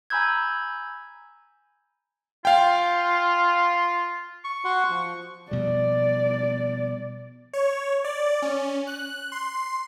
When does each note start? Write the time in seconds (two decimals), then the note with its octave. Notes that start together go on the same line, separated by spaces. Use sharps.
0.10 G#5 A#5 B5 E6 G6 G#6
2.45 F4 F5 G5
4.45 C#6
4.65 F#4 F#5 C6
4.90 F3
5.51 B2 F3 G3 D5
7.53 C#5
8.04 D5
8.42 C#4
8.87 F#6
9.32 C6